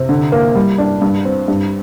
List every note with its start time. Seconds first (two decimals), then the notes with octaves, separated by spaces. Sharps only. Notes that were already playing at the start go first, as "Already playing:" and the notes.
Already playing: C3 C4
0.09 D3
0.32 A#3
0.55 G3
0.78 D4
1.01 G2
1.25 C4
1.48 G2